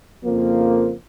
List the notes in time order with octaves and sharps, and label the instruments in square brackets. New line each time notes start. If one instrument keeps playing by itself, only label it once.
[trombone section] F2 C#3 F3 A#3